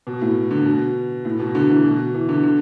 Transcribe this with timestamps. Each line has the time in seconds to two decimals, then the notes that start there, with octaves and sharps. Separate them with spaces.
0.07 B2
0.22 A2
0.51 D3
0.66 B2
1.25 A2
1.40 B2
1.55 D3
1.70 E3
1.84 B2
2.14 E3
2.29 D3
2.43 D3